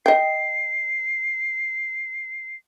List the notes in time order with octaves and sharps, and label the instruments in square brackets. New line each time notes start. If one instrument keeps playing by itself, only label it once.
[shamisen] D#5 G5 [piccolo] C7